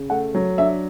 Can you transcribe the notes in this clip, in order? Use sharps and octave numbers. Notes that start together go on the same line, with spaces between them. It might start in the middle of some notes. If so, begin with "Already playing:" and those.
Already playing: C#3
A3 F#5
F#3
D4 E5